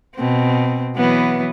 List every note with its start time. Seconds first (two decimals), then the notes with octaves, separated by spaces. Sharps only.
0.15 B2 C4
0.96 E3 F#3 B3